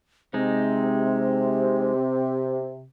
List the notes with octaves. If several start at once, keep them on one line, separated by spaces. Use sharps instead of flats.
C3 G#3 C4 D#4